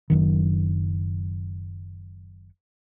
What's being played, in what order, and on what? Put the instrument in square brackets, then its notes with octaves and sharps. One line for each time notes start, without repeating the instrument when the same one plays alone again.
[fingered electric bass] F#1 F#2 D#3